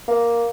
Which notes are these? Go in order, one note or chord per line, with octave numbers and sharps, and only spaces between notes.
A#3